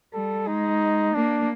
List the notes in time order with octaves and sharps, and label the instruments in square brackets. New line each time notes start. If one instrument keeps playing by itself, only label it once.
[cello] G3 [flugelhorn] A4
[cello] G#3 [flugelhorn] D#4
[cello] A#3 [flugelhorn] D4